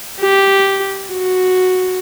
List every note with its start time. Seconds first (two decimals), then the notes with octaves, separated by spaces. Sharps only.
0.21 G4
1.11 F#4